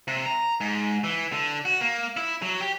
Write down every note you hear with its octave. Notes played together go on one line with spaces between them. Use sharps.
C3
A#5
G#2
E3
D3
F#4
A#3
E4
F#3
G4